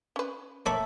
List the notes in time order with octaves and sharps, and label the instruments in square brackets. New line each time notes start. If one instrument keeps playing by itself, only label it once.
[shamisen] C#4 B4
[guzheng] A3 [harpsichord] A#3 C#5 B5